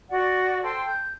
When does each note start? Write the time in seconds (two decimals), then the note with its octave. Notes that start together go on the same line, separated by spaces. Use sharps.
0.09 F#4 D5 F#5
0.63 A4 C5 G5 C6
0.86 G6